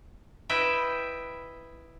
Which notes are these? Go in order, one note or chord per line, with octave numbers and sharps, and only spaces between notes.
E4 B4 D#5 E5 G5